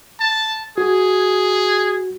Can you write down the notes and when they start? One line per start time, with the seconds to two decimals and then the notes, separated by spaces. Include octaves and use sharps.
0.20 A5
0.78 F#4 G#4